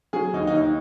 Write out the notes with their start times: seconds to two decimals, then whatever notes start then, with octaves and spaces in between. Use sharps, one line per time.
0.13 F#3 G#4
0.33 D#2 D#4
0.47 D#4
0.54 D#2
0.61 D#4